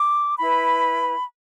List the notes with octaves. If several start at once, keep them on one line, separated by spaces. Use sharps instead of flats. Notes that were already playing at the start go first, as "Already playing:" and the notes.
Already playing: D6
E4 B4 B5